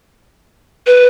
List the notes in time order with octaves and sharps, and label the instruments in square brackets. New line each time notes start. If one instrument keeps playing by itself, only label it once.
[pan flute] B4